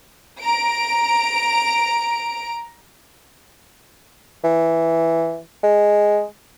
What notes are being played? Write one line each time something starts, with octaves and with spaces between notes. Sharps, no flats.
A#5 D7
E3
G#3